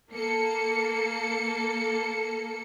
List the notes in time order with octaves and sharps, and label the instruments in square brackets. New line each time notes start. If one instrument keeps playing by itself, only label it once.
[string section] A#3 A4 C#7